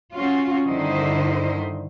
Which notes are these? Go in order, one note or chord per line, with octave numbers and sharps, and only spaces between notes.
C#4 F4 F#4
G2 D3 D#3 E4 C5 D#5